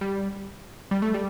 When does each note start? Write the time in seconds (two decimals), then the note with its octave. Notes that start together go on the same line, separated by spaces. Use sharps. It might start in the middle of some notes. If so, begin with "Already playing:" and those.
0.01 G3
0.91 G3
1.02 A3
1.14 G3